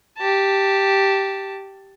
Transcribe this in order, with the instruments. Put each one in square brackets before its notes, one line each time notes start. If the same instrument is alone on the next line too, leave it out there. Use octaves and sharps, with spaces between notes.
[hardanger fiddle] G4 A5